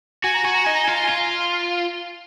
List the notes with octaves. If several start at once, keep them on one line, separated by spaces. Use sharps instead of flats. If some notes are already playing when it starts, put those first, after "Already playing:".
F#4 G#5
A#5
F#4 G#5
A#5
D#4 G#5
A#5
F4 G#5
A#5
G#5
F4